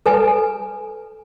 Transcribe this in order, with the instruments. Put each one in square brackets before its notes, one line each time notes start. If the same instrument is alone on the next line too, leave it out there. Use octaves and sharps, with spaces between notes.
[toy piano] A4 B4 G#5